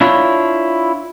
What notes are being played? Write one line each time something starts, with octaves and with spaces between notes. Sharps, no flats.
D4 E4 F4 C#5